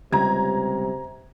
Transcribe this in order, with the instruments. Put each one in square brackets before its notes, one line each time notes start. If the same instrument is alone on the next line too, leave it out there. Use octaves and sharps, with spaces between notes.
[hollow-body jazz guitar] C#2 [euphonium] C3 [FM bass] G3 [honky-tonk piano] A#5 G#6